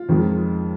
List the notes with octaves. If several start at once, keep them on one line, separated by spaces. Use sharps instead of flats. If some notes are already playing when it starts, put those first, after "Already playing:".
Already playing: F4
F2 D#3 G#3